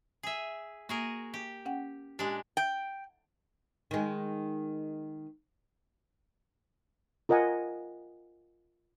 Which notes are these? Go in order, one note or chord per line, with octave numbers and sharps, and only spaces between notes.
G#4 E5
A#3 F#4 G#4 A#4
G4
C#4 F#5 G5
A#2 G#3 D4 G4
G5
D#3 G#3
F4 A#4 D#5 F#5 G#5